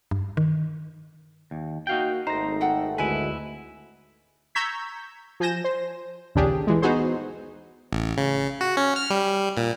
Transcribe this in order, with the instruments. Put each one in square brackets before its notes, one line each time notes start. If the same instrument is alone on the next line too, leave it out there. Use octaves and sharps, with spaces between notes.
[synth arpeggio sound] G2
D#3
[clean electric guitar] D#2
[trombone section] A#3 F#4 [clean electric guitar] D#4 F5 G5
[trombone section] G#1 A3 [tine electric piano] D#4 A#6 [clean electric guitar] C5 [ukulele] A#5
[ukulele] A4 F#5 G5
[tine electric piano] D2 G#3 [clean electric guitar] E4 B4 [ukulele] G#5
[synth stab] A#5 C#6 E6 G6 G#6 B6
F3 G#5 G6 A#6 E7
C5
A#1 D#2 C#3 D4 G4 G#4
E3 G#3
B3 D#4 F#4 G#4 C5
[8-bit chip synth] A1
C#3
F#4
C#4
F6
G3
A#2